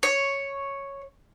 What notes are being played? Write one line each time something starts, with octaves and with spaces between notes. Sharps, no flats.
C#5